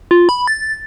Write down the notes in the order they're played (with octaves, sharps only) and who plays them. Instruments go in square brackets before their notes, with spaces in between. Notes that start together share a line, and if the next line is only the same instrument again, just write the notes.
[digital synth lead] F4
B5
A6